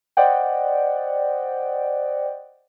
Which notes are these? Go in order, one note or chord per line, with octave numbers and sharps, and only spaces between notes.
C5 D5 D#5 F#5 G5